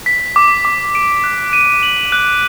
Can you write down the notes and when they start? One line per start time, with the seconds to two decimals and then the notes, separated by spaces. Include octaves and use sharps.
0.06 B6
0.36 D6
0.65 D6
0.95 D7
1.24 F#6
1.53 D#7
1.83 F#7
2.12 F#6